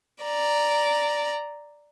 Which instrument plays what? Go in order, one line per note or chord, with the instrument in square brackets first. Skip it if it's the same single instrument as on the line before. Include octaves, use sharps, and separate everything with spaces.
[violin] D5 A#5